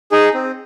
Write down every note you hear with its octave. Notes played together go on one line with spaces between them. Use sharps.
D#4 G#4
C4